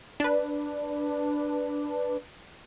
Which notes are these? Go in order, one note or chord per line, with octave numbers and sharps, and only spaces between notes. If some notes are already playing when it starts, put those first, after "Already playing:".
D4 B4